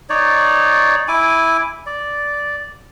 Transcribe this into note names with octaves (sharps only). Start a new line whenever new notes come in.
D#4 C#5 D5
E4 G#5 D6
D5